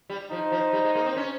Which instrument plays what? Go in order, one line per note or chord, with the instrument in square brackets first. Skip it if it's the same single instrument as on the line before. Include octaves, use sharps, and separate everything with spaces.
[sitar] G3
[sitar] F3 [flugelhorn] D#4
[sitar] F3
G3
G#3
A#3
C4
C#4